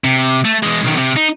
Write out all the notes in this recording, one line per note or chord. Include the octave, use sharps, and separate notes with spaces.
C3
A3
E2 G#3
B1 D#3
C3
D#4